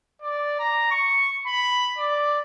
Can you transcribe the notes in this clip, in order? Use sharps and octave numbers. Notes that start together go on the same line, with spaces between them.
D5
A#5
C#6
B5
D5